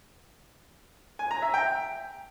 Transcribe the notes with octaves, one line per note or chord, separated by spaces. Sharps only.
G#5
A#5
E5
G5